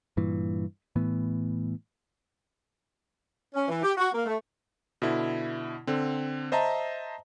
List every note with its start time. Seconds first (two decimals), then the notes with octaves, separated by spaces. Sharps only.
0.17 G2 A#2 E3
0.96 A2 E3 B3
3.55 C#4
3.68 E3
3.83 G4
3.98 F#4
4.14 A#3
4.26 A3
5.02 B2 D3 E4
5.87 D3 C4
6.52 C5 D#5 E5 A5 A#5